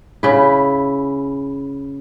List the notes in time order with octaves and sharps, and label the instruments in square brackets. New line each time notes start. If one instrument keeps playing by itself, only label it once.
[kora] C#3 E4